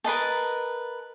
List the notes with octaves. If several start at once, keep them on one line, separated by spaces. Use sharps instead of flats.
A#4 B4 D#5 A5